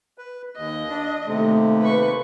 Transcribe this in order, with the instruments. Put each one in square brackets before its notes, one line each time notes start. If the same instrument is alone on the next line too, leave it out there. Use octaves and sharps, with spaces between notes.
[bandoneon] B4
[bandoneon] D#2 [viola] D#5
[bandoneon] D4
[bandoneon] D#2 C3 [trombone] A3
[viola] B4 C#6